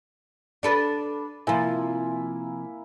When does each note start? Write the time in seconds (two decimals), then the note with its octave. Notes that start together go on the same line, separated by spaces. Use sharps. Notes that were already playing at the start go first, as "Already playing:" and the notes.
0.63 D4 A4 B4
1.47 C3 F3 A#3 E4 G#5